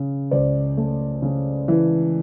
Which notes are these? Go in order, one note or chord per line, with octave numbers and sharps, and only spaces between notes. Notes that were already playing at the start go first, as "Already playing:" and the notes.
Already playing: C#3
C#2 C5 D5
A3
C#3
E3